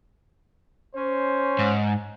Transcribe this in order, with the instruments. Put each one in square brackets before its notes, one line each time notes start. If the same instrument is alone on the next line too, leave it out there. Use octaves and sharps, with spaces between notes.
[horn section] C#4 C5
[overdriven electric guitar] G#2